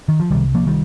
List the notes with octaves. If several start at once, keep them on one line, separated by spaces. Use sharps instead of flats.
D#3
F3
C2 C3 D#3 G3
F3 A#3
D#3 G3